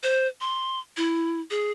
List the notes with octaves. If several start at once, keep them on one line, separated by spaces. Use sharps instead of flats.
C5
C6
E4
G#4